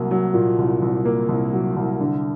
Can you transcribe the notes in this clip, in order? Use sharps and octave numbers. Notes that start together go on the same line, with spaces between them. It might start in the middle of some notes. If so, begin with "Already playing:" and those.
Already playing: C2 F#3 A#3
F#3
A#2
C2
C2
A#3
C2
F#3
C2
D3